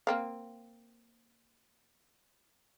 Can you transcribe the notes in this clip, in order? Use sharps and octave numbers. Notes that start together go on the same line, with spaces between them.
A#3 C4 F5